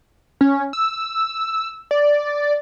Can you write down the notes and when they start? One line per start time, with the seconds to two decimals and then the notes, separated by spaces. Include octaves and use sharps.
0.41 C#4
0.73 E6
1.91 D5